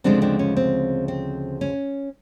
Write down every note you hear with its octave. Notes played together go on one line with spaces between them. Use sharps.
D2 C#3 F3 G#3 C4 D4
C4 D4
C#4
C4
C4
C#4